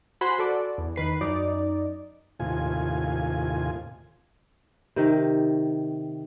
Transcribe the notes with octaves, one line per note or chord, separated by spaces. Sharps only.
F#4 C5 G#5 B5 C6 F#6
F#4 A4 D5
E2
D#3 B4 C7
F#2 D#4 D5
D#2 A2 C3 F4 G#5
C3 D#3